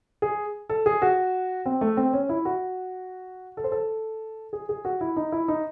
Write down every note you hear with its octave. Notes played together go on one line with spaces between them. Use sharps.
G#4
A4
G#4
F#4
C4
A3
C4
C#4
E4
F#4
A4
C5
A4
G#4
G#4
F#4
E4
D#4
E4
D#4